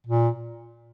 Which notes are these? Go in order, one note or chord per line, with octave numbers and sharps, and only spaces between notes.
A#2